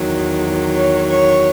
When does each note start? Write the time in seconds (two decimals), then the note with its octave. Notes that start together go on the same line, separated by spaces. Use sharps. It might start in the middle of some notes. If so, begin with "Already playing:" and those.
Already playing: E2 D#3 F#3
0.74 C#5
1.08 C#5